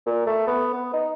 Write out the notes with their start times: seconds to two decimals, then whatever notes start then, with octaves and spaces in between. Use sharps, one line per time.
0.06 A#2
0.26 A3
0.47 B3
0.73 B3
0.93 D#4